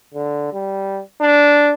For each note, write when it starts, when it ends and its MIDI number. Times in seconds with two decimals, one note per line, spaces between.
0.14 0.52 50
0.53 1.00 55
1.21 1.73 62